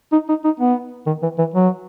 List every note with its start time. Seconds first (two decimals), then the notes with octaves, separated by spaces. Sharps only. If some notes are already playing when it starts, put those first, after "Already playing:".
0.12 D#4
0.29 D#4
0.44 D#4
0.60 B3
1.06 D#3
1.22 E3
1.38 E3
1.54 F#3